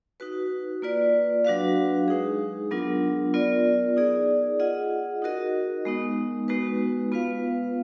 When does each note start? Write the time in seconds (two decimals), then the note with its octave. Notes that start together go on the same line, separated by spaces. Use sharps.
0.20 D#4 F#4 B4
0.82 A#3 F4 B4 D5
1.45 F#3 D4 F#4 B4 F5
2.08 G#3 D#4 G#4
2.71 F#3 B3 D4 F4 A#4
3.34 B3 F4 A#4 D5
3.97 D#4 G#4 D5
4.60 F4 G#4 D#5 F#5
5.22 D#4 F#4 A#4 D#5
5.85 G#3 B3 D#4
6.48 G#3 B3 D#4 F#4 B4
7.12 B3 F4 B4 F5